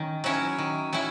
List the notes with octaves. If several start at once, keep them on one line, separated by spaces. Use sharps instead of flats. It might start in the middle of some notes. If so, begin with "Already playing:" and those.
Already playing: D#3 C#4
F#3 C#4 E4
D#3
F#3 C#4 E4